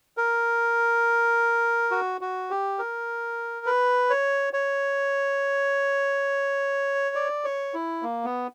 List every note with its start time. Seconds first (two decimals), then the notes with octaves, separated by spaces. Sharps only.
0.17 A#4
1.91 F#4
2.21 F#4
2.50 G4
2.79 A#4
3.66 B4
4.10 C#5
4.53 C#5
7.15 D5
7.44 C#5
7.74 E4
8.02 A#3
8.24 B3